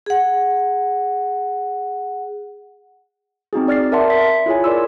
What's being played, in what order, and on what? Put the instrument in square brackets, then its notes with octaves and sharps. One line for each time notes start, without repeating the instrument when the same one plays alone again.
[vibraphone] G#4 F#5
[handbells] C4 D#4 F#4 G#4
D5 F6 A6 C7
A#4 D5 E5 F#5 A5 C6
E5 B6
E4 F4 G#4 C#5 G#5
A#4 D5 C6 E6